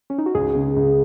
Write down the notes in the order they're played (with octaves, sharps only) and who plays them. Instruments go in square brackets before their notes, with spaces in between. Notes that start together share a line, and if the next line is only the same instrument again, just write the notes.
[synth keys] C#4
D#4
F#4
[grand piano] C#2 [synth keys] G#4
[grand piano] C#3
C#2